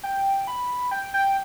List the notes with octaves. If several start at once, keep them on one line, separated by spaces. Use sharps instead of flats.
G5
B5
G5
G5